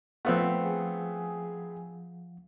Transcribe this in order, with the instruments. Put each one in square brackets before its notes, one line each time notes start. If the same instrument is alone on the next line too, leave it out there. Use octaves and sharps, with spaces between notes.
[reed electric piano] F3 F5 F#5 [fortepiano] A3 B3 C4
[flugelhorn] G#4